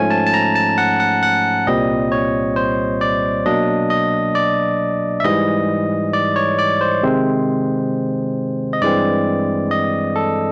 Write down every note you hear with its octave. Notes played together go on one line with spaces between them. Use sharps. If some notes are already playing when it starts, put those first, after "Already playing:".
Already playing: G#2 F3 A3 C#4 G#5
A5
A5
A#5
A5
F#5
F#5
F#5
C2 A#2 G3 C4 D#5
C#5
C5
D5
B2 F#3 A#3 D4 D#5
D#5
D5
E5
G#2 E3 G3 D#5
D5
C#5
D5
C5
C3 D#3 G#3 C4
D#5
G2 E3 G#3 C4 D5
D#5
A4